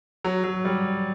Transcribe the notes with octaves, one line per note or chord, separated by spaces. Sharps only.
F#3
F#3
G3